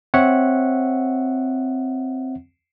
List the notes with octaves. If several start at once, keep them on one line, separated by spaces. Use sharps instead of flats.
C4 C#5 E5 F#5